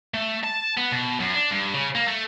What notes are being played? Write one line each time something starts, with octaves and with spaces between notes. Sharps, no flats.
A3
A5
B3
B2
F#2
D4
G2
C#3
A#3
A3